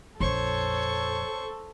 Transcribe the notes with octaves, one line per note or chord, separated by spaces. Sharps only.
A#1 F2 A4 C5 C#5 C#6